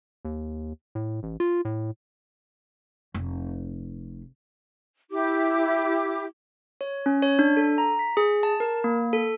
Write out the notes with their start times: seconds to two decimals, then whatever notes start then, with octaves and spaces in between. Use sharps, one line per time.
0.25 D#2
0.95 A2
1.23 A1
1.40 F4
1.65 A2
3.14 F1
5.11 E4 G4 D6
6.81 C#5
7.06 C#4
7.22 C#5
7.39 D4
7.57 A4
7.78 A#5
7.99 B6
8.17 G#4
8.43 A5
8.60 A#4
8.84 A#3
9.13 A4